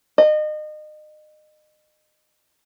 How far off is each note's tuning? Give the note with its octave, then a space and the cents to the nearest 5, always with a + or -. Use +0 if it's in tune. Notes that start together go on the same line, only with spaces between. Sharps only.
D#5 -30